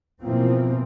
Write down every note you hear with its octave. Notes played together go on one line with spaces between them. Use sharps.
B2 E3 F3 A#3 C4